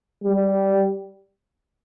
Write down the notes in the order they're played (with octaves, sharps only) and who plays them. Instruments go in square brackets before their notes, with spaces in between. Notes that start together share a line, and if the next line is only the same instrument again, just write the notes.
[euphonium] G3